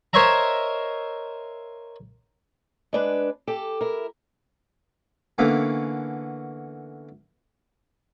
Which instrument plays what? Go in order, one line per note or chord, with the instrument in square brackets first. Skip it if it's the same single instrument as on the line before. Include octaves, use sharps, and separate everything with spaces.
[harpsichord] A#4 C5 C#5 D#5 E5 A#5
[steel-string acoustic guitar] G#3 D4 B4
G4 A4
E4 A#4
[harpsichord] D3 E3 A#3 B3 C#4